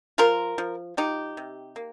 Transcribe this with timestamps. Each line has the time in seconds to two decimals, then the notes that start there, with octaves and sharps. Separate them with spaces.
0.18 F3 F4 A#4
0.58 F3
0.97 F3 D#4 G4
1.37 C3
1.76 A#3